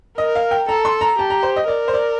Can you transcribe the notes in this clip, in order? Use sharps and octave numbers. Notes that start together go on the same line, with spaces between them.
A#4 D#5
F5
G5
A4 A#5
C6
A#5
G4 A5
A#5
C5
D#5
A#4 D5
C5
D5